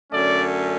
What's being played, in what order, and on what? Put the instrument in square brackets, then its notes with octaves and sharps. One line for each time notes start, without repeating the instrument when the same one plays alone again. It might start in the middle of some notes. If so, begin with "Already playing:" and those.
[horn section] F#2 D3 A3 C#4 D5